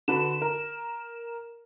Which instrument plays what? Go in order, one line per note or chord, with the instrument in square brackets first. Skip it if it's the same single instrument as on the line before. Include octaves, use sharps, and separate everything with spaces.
[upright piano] D3 F#4 B4 [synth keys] E7
[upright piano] A#4